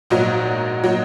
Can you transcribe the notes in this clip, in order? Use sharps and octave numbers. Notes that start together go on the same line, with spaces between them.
A#1 G#2 F#3 A#3 D#4
F#3 A#3 D#4